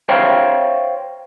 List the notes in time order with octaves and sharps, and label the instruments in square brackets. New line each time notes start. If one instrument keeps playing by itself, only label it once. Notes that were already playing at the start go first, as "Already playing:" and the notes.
[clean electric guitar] C5 C#5 E5 F5 G5